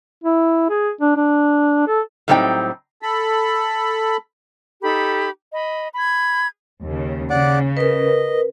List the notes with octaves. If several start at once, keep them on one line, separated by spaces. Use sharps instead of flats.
E4
G#4
D4
D4
A4
A2 F#3 G3 C4 D#4 G5
A4 B5
D#4 G4 A4 B5
D#5 B5
B5 G#6
D#2 C#3
C#3 D5 F#5 D6
A#4 B4 D#5